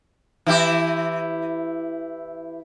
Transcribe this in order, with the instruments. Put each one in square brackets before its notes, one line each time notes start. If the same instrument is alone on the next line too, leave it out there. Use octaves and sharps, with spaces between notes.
[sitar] E3 E4 G4